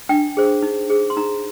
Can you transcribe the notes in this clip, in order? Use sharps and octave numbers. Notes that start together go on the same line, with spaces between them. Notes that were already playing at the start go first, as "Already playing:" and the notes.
D4 G5
G#4 C5
D#4
G#4 C5
C6
D#4 A#5